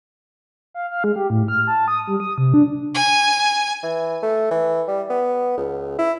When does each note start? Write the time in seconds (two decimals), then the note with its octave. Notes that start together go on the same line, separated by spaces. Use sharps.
0.74 F5
0.91 F5
1.04 G#3
1.16 G4
1.30 A2
1.48 F6
1.67 A5
1.88 D#6
2.07 G3
2.20 D#6
2.38 C3
2.54 D4
2.94 G#5
3.83 E3
4.23 A3
4.51 E3
4.88 G3
5.10 B3
5.58 C#2
5.99 E4